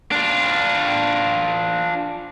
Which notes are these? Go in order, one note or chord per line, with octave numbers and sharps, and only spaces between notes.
D4 F4